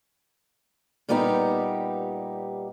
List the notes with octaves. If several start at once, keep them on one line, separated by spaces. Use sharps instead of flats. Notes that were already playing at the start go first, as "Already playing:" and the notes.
A#2 G3 B3 D#4 G4